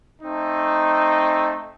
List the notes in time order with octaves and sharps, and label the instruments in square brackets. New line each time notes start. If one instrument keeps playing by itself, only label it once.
[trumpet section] A3 C4 D#4